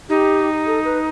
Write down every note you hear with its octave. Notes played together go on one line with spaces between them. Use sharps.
D#4 G4
A4
B4